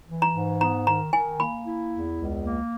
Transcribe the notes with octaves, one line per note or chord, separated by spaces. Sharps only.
E3
A#5
G#2
B3 A#5
D#3 A#5
D#3 G#5
A#3 B5
E4
E2
C#2
A#3